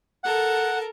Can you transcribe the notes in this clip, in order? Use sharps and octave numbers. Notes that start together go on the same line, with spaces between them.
A4 A#4 F#5 A5